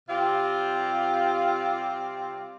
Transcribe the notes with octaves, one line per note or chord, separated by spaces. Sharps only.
C3 G3 C4 F4 G4